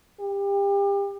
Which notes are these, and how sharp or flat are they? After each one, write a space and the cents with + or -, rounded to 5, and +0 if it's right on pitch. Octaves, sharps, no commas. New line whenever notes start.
G4 +30